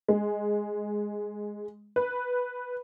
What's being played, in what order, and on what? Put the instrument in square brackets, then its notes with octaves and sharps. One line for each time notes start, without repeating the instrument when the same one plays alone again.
[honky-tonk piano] G#3
B4